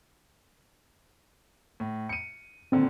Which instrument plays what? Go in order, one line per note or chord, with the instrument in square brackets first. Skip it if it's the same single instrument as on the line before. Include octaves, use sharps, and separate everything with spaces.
[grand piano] A2
C#7 D#7
[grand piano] A#2 D3 D#3 [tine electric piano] C4